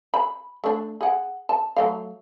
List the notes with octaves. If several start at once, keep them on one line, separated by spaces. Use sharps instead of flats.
B5
A3 D4
G#4 F#5
A5
F#3 A3 F5